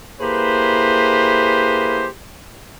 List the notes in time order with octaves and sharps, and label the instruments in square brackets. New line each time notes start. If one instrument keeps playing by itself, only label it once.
[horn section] A#3 E4 G4 G#4 B4 C5